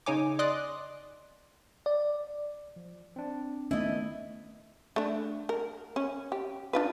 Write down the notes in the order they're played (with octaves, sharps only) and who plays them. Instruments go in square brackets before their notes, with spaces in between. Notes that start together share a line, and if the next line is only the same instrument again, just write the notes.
[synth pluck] C#3 D#4 C#5 G#5 D6
D5 D#5 C6 D6 D#6 F#6
[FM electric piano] D5
[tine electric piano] F3
C4 D4
[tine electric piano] D#3 [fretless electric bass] A3 B3 C#4 [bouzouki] E4 D#5
[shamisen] A3 D4
A#4
C#4
G4
D4 F4 B4